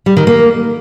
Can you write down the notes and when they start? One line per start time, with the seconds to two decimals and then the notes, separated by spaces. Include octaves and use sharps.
0.06 G3
0.17 D#3
0.27 A#3